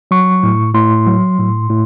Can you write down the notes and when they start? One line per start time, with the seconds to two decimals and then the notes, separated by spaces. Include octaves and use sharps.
0.11 F#3 C#6
0.43 A2
0.74 A2 C6
1.06 F#3
1.38 A2
1.70 A2